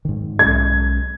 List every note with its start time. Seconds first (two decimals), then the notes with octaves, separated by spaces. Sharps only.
0.05 G#2 D#3
0.39 B1 G#3 C#4 G#6